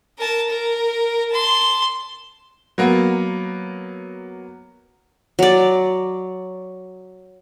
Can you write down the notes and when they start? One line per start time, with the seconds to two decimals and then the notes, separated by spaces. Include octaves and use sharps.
0.18 A#4 A5
0.48 A#4
1.30 A5 C6
2.78 F#3 A#3 B3
5.39 F#3 D5